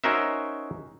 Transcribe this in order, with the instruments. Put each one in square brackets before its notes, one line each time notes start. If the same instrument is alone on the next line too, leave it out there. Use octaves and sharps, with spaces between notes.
[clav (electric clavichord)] C#4 D#4 F#4 A#4 C5 E5